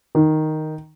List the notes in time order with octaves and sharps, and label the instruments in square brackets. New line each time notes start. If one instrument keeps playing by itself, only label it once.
[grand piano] D#3